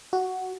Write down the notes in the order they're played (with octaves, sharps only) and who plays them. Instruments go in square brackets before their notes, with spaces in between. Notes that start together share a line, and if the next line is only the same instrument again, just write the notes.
[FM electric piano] F#4